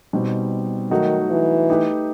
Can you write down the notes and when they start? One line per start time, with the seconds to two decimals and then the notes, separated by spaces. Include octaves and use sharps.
0.13 B2 G3 C4 D#4
0.91 D#3 F#3 A3 D#4 F#4
1.30 E3
1.69 A3 D#4 G4 B4